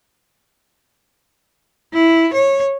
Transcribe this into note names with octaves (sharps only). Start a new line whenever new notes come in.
E4
C#5